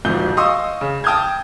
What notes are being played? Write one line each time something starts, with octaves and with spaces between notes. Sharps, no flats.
D#1 G#2 F3 F#4 G6 G7
D#5 F5 C6 C#6 D#6 E6
C#3
G5 A5 D#6 F6 G6 G#6